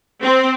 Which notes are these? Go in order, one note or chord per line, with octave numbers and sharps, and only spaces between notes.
C4